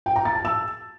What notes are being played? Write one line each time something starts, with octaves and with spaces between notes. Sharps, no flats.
G5
A#5
A6
A5
E6